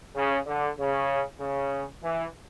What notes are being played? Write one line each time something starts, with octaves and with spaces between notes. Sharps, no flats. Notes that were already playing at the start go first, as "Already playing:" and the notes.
C#3
D3
C#3
C#3
E3